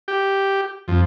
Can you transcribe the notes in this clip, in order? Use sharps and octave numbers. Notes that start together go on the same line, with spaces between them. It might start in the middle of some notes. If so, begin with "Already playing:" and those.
G4
F2